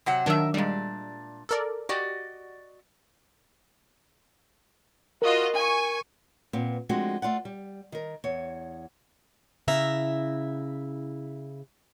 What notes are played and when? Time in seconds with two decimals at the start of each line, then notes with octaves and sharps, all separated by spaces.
0.06 C3 F#3 F#5
0.26 D#3 F#3 D4 A#4 E5
0.54 A#2 G3 G#3 D4
1.49 A4 A#4 D5
1.89 F#4 G4 D5 D#5
5.22 F4 F#4 A#4 D#5
5.56 G#5 C#6
6.53 A#2 B3 C4
6.89 F3 G#3 A3 C4 D4 F#4
7.22 A3 F4 D5 F#5
7.45 G3
7.92 D#3 A#4
8.24 E2 C#5
9.68 C#3 E4 E5 A#5